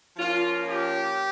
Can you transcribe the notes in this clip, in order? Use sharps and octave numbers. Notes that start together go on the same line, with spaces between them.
F3 A#3 C#4 F4
G4